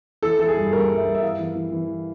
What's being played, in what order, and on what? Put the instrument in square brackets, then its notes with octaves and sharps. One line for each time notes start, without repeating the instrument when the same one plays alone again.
[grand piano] E3 A4
E3 A4
G#4
G2
G2 A#4
G2
E5
G2
E5
E3 F5
E3
E3
E3